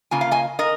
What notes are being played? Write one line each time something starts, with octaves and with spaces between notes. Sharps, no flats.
C#3 A#3 F4 G#5
F5
D#5 G#5
A#4 D#5